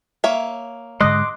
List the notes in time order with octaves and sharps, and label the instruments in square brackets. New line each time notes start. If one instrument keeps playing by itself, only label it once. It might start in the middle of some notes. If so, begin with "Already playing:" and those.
[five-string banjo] A#3 C#5 E5
[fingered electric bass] G#2 D3 G#3 [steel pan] D#5 [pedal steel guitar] C6 D6 F#6